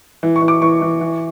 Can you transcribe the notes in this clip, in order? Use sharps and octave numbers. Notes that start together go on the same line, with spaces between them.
E3
C#6
E3
D6
E3 C#6
E3
E3